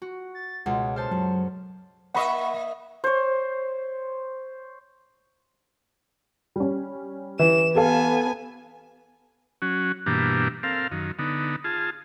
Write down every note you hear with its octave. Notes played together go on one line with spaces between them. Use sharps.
F#4
A6
C#2 B2 F#5
A4 C5 A5 F6
F#2 F#3
A#3 D#5 E5 F#5 B5 C#6
C5 C#5
G3 C#4
E3 E7
B3 G4 A4 F5 G#5
F#3 C#4 F#4
G2 B2 E3 A#3 D4 G4
C4 A4 A#4 F5
F#2 D#3
D3 B3 D#4
F4 G#4 A5